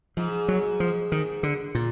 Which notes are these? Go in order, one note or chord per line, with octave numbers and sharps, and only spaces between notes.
G#2 F3
F#3
F3
D#3
D3
A#2